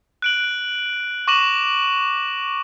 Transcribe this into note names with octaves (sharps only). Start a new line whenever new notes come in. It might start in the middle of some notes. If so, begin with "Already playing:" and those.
F#6 D7 F#7
C#6 D6 A#6 D#7 E7 F#7